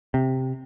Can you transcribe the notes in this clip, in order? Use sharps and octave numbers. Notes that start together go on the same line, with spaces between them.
C3